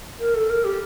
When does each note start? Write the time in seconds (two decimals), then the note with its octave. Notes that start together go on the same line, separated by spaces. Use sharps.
0.20 A#4
0.35 A4
0.50 A#4
0.64 G4